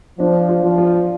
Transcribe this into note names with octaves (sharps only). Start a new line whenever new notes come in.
F3 D4
F4
F3
F4